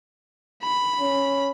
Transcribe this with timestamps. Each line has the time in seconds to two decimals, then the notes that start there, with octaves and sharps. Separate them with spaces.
0.63 B5
0.99 C#4